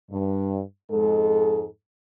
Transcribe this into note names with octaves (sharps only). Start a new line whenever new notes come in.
G2
F2 G#2 G#3 A4